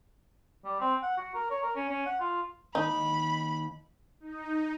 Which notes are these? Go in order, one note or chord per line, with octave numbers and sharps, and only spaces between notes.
G3
C4
F#5
F#4
A#4
C#5
A#4
C#4
C#4
F#5
F4
D#2 D#4 B5
D#4